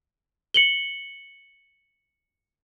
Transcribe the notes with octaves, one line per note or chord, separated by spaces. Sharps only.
C#7 F#7 G7